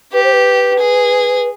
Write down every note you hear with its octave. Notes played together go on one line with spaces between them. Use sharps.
G4 B4
C5
B4
G#4